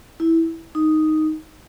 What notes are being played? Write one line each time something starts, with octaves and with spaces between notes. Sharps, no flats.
E4
D#4